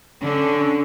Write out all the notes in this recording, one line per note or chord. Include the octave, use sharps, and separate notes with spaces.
D3 C#4 D4